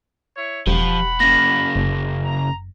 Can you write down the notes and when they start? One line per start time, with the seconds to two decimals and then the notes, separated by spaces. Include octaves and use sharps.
0.35 E4 C#5
0.67 E1 F3 G4 F#5 B5
1.20 C#3 A#3 A#6
1.76 F#1
2.24 A#5